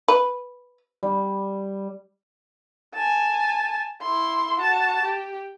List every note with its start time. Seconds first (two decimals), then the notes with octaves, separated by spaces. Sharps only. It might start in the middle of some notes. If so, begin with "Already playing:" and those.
0.08 B4
1.03 G3
2.95 G#5 A5
4.02 E4 C6
4.60 F#4 A5
5.04 G4